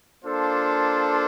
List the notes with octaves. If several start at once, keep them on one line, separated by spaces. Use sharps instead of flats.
A#3 D4 F4 A4 C5